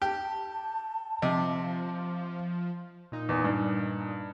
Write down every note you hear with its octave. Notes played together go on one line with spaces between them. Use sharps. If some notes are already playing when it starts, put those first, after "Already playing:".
G4 A5
C3 F3 D#5
A#2 D#4
E2
G2